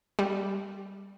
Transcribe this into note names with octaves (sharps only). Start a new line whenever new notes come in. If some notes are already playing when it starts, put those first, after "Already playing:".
G3